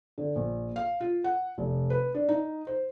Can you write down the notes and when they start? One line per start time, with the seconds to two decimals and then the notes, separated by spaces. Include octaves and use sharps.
0.18 D3
0.36 A#1
0.76 F5
1.01 F4
1.24 F#5
1.58 F1
1.90 B4
2.14 D4
2.29 D#4
2.67 C5